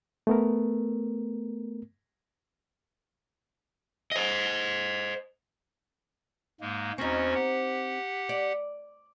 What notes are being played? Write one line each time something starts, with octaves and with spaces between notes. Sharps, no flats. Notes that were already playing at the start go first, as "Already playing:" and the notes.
A3 B3 A#4
C5 D#5
G#2 G#3 A#3
E2 C4 C#4 D#4 F#4
G4 F#5
D5